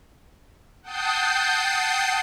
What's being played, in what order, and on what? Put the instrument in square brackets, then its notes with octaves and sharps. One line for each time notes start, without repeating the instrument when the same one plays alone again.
[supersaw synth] F#5 G5 A5 D#6 G6 C7